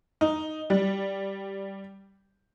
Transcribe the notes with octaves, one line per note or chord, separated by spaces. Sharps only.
D#4
G3